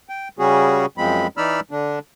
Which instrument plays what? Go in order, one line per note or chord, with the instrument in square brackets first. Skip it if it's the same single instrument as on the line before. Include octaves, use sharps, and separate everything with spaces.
[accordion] G5
C#3 G3 C#4 F#4 G#4
F#2 F3 G#3 C4 B5
E3 D#4 D5 B5 E6 F6
D3 D4